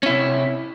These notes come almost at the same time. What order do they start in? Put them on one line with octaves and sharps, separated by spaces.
C#4 E4 C3